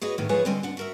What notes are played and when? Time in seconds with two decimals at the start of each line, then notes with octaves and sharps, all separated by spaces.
0.01 F#4 G#4 B4 C#5 D#5
0.18 A2 D#3 E3 A3 B3
0.29 D#3 F3 G#3 G#4 B4 C#5
0.45 D3 G3 C4 D#5 G5 G#5
0.63 D4 F#5
0.77 F#4 A#4 E5